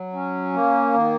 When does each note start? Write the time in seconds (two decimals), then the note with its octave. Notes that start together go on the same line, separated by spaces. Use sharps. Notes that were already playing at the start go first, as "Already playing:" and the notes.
Already playing: F#3
0.13 C#4
0.53 A#3
0.94 D#3